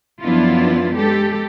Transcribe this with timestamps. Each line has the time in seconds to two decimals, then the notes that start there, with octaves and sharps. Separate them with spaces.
0.21 F#2 F3 B3 D4 E4 F4
0.96 G#3 G4 A4